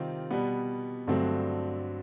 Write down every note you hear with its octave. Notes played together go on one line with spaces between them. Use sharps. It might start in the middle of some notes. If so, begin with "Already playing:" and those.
Already playing: C3 D#3 G3 C4 F4
B2 G3 B3
G2 D3 F#3 A3 C4